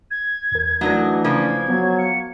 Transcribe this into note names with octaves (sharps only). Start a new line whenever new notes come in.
G#6
E2 A#4
E3 F#3 A3 D4 D#4 A#4
C#3 F3 A#3 G#6
F#3 B3
F5 C#7